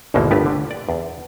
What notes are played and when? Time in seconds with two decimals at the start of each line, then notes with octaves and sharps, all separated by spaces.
0.14 G#1 D2 B2 E3 G#3 A#3
0.31 G1 G2 A3 B3 G4 B4
0.46 D3
0.71 D5
0.89 E2